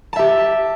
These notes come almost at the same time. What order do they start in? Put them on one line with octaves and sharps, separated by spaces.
A5 E5 G4